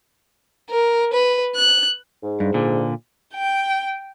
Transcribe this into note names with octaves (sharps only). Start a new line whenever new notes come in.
A#4
B4
F#6
G#2
G2
A#2 D3
G5